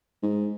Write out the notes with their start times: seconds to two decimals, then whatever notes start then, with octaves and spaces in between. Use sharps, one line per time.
0.22 G#2